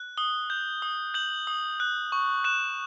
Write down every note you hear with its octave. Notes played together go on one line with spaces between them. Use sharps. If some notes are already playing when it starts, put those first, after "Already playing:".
Already playing: F#6
D#6 G7
G6
D#6
G6 F#7
D#6
F#6
C#6
F#6 E7